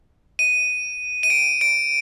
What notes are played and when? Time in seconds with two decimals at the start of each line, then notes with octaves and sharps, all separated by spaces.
0.39 D#7
1.23 D#7
1.30 D7
1.61 D7